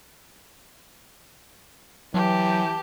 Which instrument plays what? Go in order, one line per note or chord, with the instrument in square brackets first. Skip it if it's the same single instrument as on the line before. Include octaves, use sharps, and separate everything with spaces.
[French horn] E3 [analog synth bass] F#3 [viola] G4 [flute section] G5 A5